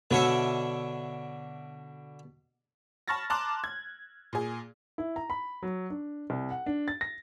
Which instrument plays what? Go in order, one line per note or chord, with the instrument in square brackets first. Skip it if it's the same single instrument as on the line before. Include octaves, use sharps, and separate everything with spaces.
[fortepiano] B2 [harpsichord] D3 C#5 E5
[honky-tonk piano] A5 B5 C#6 F6 A6 A#6
A5 A#5 C6 D6 F#6
G#6
A#2 G#4
[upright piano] E4
A#5
B5
F#3
D4
C2
F#5
D4
A6
A#6